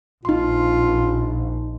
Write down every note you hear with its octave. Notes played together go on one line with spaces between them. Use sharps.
A#1 D#4 F4 C6